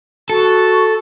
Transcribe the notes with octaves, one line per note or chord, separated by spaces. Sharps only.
F#4 A4